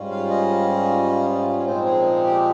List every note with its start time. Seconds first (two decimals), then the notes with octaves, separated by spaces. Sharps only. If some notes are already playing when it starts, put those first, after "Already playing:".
Already playing: G#2 G3 C#4 F4
0.10 F5
0.30 D#5
1.59 C#5
1.66 A#2 F3 G#3 C4 D#4 C5
1.85 G#4
2.24 G4